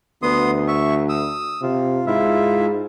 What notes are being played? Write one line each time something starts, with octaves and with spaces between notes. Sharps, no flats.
D2 B3 C6 D#6
E5 C#6
D#6 E6
C3 F4
G#2 E4 F4 E5